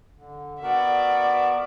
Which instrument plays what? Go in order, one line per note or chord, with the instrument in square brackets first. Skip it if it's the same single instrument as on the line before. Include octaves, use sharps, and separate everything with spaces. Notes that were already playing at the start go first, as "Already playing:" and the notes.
[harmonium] D3
[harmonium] B3 F#4 A#4 [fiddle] D5 E5 [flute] F#5